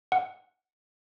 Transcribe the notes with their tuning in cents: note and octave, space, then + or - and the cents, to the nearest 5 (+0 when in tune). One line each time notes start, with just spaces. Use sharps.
F#5 +0